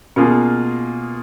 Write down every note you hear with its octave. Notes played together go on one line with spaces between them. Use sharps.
B2 A#3 C#4 F4 G#4